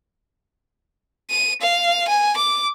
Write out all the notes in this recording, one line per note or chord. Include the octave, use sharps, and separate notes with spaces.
D#7
F5
G#5
D6